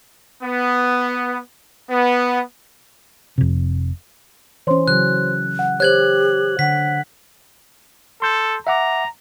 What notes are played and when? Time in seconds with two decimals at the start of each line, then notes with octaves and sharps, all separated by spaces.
0.43 B3
1.90 B3
3.38 F1 C3
4.67 E3 C#4 C5 C#5 C6
4.88 C#3 F#3 F#6
5.59 F#5
5.80 G4 C5 C#5 F#6 G#6 F#7
6.59 D3 F#5 B6
8.22 A4 C6 G6
8.67 E5 F#5 A#5 D6